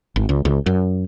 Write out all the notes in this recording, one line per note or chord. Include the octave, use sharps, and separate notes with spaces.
G#1
C#2
C#2
F#2